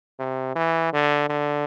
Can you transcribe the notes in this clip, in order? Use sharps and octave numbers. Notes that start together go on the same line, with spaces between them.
C3
E3
D3
D3